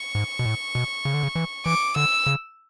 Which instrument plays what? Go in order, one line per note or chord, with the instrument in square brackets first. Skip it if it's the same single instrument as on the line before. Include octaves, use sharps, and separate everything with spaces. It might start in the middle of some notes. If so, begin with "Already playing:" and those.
Already playing: [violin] C#6
[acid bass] G#2
B2
A2
B2
C#3
D3
C#3
E3
[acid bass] E3 [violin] D6
[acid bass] D3 [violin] E6
[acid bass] C#3